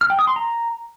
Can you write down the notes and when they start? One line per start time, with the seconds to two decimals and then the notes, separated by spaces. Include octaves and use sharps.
0.01 F6
0.10 G5
0.19 D#6
0.27 C6
0.36 A#5